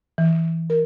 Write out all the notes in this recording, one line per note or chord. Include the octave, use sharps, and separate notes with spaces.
E3
A#4